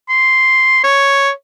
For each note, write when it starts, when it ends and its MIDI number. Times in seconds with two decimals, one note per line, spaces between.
0.09 0.80 84
0.83 1.30 73